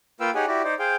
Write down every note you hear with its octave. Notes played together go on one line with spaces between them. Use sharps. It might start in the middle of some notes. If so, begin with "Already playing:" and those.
A#3 F4 B4 F5 G5 E6
D#4 G4 G#4 C#5 F#5 G#5
E4 F#4 G4 D5
D#4 C5 D5
G#4 C5 F5 G5